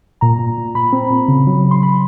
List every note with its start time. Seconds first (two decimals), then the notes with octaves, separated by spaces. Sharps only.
0.21 A#2 A#5
0.39 A#2
0.58 A#2
0.75 A#2 B5
0.93 C4
1.10 A#2
1.28 C#3
1.47 F#3
1.65 C#3
1.71 C6
1.83 F#3 B5